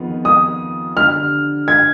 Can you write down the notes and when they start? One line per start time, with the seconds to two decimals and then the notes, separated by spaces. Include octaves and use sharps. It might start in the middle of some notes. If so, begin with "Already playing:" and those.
Already playing: F2 D#3 B3 F4 G#4
0.25 D#6
0.97 D3 G3 D4 F6
1.68 G#6